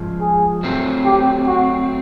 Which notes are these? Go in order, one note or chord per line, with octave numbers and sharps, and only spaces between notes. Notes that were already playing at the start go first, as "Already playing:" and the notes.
Already playing: G#2 F3 G#3
G#4
F#3 A3 C4
G4
F#4